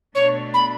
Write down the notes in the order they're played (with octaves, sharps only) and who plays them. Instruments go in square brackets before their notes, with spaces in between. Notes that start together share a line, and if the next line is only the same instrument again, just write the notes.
[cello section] B2 A3 D4 [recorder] C#5
[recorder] B5